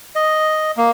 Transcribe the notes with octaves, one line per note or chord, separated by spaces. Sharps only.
D#5
A#3